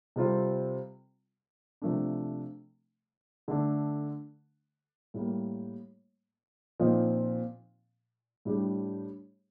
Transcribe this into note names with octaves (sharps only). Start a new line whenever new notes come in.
C3 G3 C4 F4 A4
C3 F3 A3 D4
D3 A3 D4
A2 G3 A#3
A#2 F3 C4 D#4
A2 G3 D4 G4